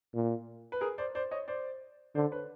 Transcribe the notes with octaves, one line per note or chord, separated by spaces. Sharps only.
A#2
B4
G#4 A#4
C5 D5
C5 D5
C#5 D#5
C5 D5
D3 C5 D5
B4 C#5